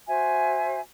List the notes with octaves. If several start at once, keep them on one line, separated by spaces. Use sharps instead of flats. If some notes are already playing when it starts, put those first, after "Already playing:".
F#4 C5 E5 G#5